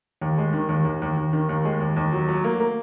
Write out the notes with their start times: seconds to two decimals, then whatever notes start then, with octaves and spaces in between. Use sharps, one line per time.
0.21 D#2
0.38 G#3
0.53 D#3
0.69 D#2
0.85 D#2
1.02 D#2
1.17 D#2
1.33 D#3
1.49 D#2
1.65 G#3
1.81 D#2
1.96 D#2
2.13 F#3
2.28 F#3
2.44 A#3
2.60 A#3